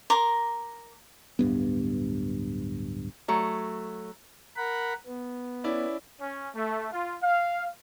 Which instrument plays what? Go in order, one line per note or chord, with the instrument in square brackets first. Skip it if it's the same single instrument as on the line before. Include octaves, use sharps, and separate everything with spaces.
[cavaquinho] A#4 A#5 C6 D6
[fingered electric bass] D1 G2 B3
[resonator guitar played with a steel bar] F#3 A3
[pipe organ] A#4 F#5 B5
B3
[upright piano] C#4 E4 D5
[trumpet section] C#4
A3
F4
F5